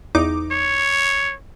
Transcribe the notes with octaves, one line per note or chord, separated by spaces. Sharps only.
E2 D#4 D6
C#5